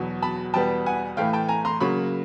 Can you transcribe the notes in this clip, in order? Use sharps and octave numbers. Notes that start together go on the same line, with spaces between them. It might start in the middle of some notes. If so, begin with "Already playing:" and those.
Already playing: E2 B2 F#3
A5 B5
E2 B2 G3 B3 G5 A5
F#5 G#5
A2 E3 A3 F5 G5
G5 A5
G#5 A#5
A#5 C6
C#3 F#3 A#3 B5 C#6